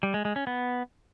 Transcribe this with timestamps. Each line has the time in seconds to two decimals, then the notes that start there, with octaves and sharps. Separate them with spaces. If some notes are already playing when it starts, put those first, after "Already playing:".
0.03 G3
0.14 G#3
0.25 G#3
0.36 C#4
0.47 B3